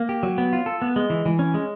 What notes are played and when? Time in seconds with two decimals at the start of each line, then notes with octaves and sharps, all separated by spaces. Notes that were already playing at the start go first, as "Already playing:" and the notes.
Already playing: A#3
0.09 G4
0.23 F#3
0.38 B3
0.53 F4
0.66 A4
0.82 B3
0.96 G#3
1.10 E3
1.26 E3
1.39 C#4
1.54 G#3